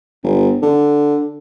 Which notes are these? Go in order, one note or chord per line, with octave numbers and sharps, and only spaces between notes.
G1
D3